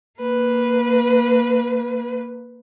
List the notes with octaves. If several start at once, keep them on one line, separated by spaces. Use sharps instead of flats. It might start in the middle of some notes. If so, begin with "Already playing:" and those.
A#3 B4